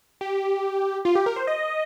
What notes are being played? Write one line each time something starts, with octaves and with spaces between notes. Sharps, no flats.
G4
F4
G4
A#4
C5
D#5